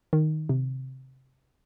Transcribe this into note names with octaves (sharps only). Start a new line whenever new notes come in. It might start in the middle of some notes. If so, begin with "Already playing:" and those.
D#3
C3